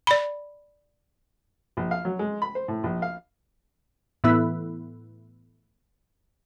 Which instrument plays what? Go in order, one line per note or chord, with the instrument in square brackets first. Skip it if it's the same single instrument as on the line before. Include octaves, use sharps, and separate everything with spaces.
[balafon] D5 B5
[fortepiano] A#1
F5
F#3
G#3
B5
C5
A2
A#1
F5
[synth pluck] A2 E3 B3 E4